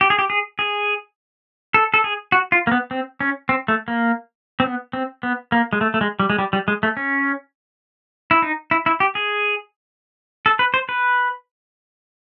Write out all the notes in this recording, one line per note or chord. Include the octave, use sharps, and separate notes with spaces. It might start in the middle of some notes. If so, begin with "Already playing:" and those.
G4
G#4
G4
G#4
G#4
A4
A4
G#4
F#4
F4
A#3
B3
C4
C#4
C4
A3
A#3
C4
B3
C4
B3
A#3
G#3
A3
A3
G#3
G3
G#3
G3
G3
G#3
A3
C#4
E4
D#4
E4
E4
G4
G#4
A4
B4
C5
B4